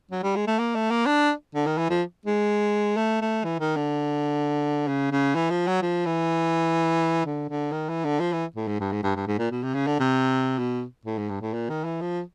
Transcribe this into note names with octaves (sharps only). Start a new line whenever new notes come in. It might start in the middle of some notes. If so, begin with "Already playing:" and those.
F#3
G3
G#3
A3
A#3
A3
A#3
D4
D3
D#3
E3
F3
G#3
A3
A3
E3
D#3
D3
C#3
C#3
E3
F3
F#3
F3
E3
D3
D3
D#3
E3
D3
F3
E3
A2
G#2
G2
G#2
G2
G2
G#2
A#2
B2
C3
C#3
D3
C3
B2
A2
G#2
G2
A2
A#2
D#3
E3
F3